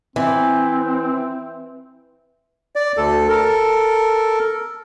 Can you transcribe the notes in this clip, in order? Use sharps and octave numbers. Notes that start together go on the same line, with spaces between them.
E3 C4
D5
D2 A4
A4 A#4